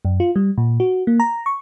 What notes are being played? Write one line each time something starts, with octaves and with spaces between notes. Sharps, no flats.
F#2
F4
G3
A#2
F#4
A#3
A#5
C#6